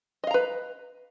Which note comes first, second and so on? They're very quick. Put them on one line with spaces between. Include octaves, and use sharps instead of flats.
D#5 F5 A#5 B4